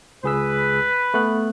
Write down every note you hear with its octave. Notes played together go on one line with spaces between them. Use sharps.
C#2 G#4 B4 E6
A3 B3 F#6